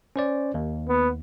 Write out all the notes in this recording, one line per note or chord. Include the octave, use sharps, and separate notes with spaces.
C#4 C5 D5
D#2
B3